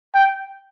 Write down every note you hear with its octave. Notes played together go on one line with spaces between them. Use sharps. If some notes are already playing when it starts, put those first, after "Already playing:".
G5